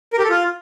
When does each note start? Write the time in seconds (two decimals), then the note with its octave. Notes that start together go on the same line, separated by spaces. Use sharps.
0.13 A#4
0.19 G4
0.24 A4
0.30 F4